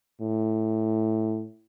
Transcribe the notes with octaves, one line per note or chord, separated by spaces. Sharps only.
A2